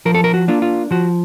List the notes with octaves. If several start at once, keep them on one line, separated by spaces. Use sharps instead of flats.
F3 A#4
A4
A#4
F#4
A#3 D4 F4
F4
F3 F#4